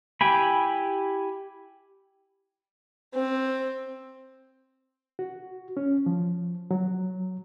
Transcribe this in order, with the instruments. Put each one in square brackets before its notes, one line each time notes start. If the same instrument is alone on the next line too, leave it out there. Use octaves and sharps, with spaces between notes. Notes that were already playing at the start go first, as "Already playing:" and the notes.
[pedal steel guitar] E4 G4 G5 G#5 B5
[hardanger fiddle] C4
[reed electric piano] F#4
C#4
F3
F#3